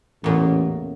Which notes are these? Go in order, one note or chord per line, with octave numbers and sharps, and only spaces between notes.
A1 E2 A#2 C#3